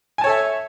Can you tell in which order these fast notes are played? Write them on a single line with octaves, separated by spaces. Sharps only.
G#5 A5 C#5 A4 E5